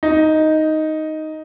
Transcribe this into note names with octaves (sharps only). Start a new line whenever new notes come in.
D#4